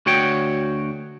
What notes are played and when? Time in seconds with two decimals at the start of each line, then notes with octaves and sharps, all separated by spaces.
0.06 D2 F#4 C#5 G5